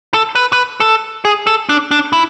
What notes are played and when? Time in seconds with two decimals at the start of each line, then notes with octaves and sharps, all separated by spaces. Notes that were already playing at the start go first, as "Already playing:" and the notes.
0.14 A4
0.35 B4
0.53 B4
0.80 A4
1.25 G#4
1.47 A4
1.69 D4
1.91 D4
2.13 E4